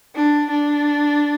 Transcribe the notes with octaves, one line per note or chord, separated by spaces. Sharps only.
D4
D4